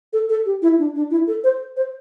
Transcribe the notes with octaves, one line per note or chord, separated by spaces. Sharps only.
A4
A4
G4
E4
D4
D4
E4
A4
C5
C5